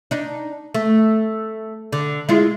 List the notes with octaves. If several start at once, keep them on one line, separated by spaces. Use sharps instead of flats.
D4 D#4
A3
D3
G#3 E4 F4